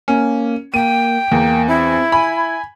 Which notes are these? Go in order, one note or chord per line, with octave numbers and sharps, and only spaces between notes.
A#3 C#4
A#3 G5 D#7
E2 A#3
C4 E4
G#5 B5